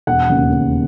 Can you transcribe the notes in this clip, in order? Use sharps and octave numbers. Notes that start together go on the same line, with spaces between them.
E1 F#5
D#2 C#3
E1